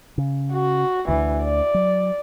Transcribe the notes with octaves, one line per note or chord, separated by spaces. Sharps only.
C#3
F#4
D2 D3 E3
D5
F#3